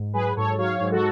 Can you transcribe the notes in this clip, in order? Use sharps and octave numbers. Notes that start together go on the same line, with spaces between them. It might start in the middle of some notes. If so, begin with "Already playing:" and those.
Already playing: G#2
F#3 G#4 B4
G#2 A4 C#5
F#3 C#5 F5
G#2
F#4 A4